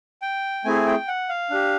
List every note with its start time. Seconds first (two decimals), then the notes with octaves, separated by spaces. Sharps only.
0.22 G5
0.65 A3 C4 E4 G#4 G#5
0.86 G5
1.08 F#5
1.29 F5
1.50 D4 G4